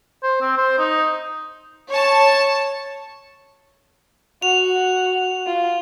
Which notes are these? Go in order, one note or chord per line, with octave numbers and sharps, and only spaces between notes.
C5
C4
C5
D#4
C#5 A5
F#4 F7
F4